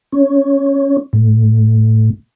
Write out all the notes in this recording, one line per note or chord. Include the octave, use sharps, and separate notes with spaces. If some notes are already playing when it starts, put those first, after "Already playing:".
C#4
A2